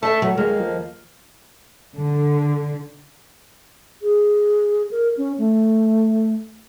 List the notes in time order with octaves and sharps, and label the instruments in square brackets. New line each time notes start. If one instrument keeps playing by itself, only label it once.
[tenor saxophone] A3 [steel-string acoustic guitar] A4 E5 A5
[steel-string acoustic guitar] F#3
[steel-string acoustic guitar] D#2 [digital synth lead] G#3 [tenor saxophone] A#3
[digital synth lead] F3
[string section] D3
[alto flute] G#4
A#4
C#4
A3